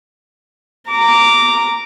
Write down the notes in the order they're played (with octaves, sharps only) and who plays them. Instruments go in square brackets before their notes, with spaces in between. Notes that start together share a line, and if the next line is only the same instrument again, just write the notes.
[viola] A#5 D6